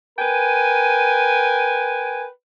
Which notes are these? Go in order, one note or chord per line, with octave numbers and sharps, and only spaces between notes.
A#4 B4 G5 G#5